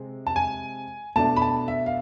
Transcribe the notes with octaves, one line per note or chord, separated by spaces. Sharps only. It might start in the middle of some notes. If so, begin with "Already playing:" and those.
Already playing: C3 G#3 C4
A5
G#5
B2 A3 D4 A5
B5
A5
E5
F5